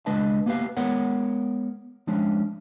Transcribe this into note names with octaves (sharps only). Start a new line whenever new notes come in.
C#2 G#3 D4 B4 D#5 A5
A#3 B3 G4 B4 F5
G#3 B3 A#4 C#5 F#5
F3 G#3 C#4 D4